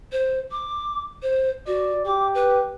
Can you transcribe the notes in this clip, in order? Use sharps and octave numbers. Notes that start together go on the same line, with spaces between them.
C5
D6
C5
F#4 D5
G4 D6
B4